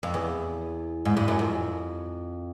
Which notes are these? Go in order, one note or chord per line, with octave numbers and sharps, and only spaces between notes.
F2
E2
G#2
G2
F#2
F2